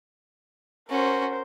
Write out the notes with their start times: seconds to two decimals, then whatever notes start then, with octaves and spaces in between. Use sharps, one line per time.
0.89 C#4 F#4 A#4 C5